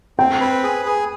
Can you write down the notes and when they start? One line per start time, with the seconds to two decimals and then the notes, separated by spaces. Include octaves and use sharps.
0.19 C4 G5
0.40 B4
0.64 G#4
0.86 G#4